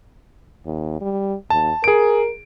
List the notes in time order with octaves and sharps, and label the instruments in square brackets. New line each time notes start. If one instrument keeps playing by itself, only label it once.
[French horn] D#2
G3
[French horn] D#2 [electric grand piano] A5
[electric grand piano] G#4 D7 [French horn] A#4